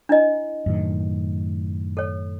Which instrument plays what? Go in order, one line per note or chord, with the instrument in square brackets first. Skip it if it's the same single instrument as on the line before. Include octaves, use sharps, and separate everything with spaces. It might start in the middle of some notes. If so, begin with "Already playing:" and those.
[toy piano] D4 E4 D#5
[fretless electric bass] F#2 A2 D#3
[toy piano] A4 C#5